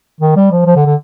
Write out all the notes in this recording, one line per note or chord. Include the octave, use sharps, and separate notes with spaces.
D#3
G3
F3
F3
D3
D3